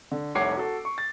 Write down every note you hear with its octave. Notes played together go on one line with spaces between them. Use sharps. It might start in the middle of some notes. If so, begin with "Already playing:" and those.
D3
F1 C2 C#5 F#5 D6 C7
F#4 A4
C#6
A6